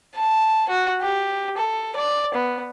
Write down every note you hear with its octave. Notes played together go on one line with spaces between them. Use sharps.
A5
F#4
G4
A4
D5
B3